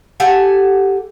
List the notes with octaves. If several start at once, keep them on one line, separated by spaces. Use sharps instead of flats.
G4 A4 F#5 G#5